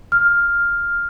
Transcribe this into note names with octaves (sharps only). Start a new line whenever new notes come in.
F6